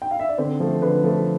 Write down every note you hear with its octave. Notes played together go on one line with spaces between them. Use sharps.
G5
F5
E5
D5
D3 C4 C5
F3 A3
D3 B4
F3 A3